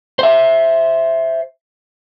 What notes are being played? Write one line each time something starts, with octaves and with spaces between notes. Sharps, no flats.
C5 E5